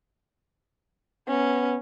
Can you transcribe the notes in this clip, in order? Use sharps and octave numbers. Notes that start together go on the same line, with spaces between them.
B3 C#4